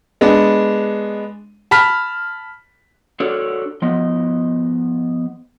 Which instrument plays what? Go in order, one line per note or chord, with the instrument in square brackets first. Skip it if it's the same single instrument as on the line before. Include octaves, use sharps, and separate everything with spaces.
[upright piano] G#3 B3 D4
A5 B5 F6 B6
[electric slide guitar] D4 F#4 A4 A#4 C#5 D5
F3 B3 D#5